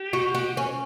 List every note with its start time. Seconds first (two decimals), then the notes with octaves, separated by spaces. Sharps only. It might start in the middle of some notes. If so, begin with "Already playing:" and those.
Already playing: G4
0.13 F#4
0.35 F#4
0.57 C#4